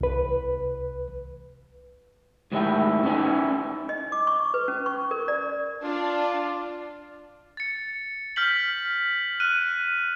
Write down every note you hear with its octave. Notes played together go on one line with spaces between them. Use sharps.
C2 B4
G#2 D#3 G3 A3 E4 G5
C#4 D#4 E4 B4 D5 G#5
D#5
D6
C#6
B4
C#4
C#6
A#4
D5
D4 F4 D5
A6 C#7
F6 G6 B6 F#7
F6 F#6 D#7